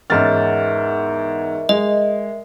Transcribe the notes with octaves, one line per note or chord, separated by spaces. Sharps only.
E2 G#2 C#4 A#4 E5 F6 A6
G#3 D#5